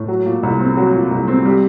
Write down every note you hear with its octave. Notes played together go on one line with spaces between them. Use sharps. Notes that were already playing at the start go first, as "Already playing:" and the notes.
Already playing: A2
F#3
A#2
C2
C4
F#3
A#2
C2
C4
G3